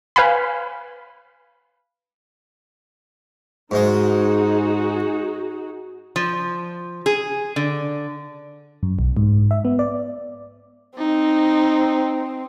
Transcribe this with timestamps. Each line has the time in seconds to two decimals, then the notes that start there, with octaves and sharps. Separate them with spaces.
0.16 B4 F5 G#5 B5
3.71 G#2 G#3 D#4 F#4 G#4
6.16 F3
7.06 G#4
7.56 D3
8.83 F#2
8.99 B1
9.17 G#2
9.51 E5
9.65 B3
9.79 D5
10.98 C4 D#4